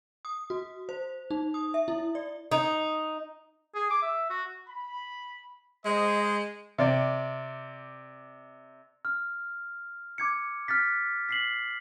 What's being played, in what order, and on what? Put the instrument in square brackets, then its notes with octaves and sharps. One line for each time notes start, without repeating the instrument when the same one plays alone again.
[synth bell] D#6
F#4
C5
D#4
D#6
E5
E4
D5
[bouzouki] D#4
[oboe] G#4
D6
E5
F#4
[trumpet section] B5
[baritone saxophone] G#3 [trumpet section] C5 D#5
[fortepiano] C3 D5
[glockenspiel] F6
D6 G#6 C#7
F6 F#6 A6 B6
B6 C7 F#7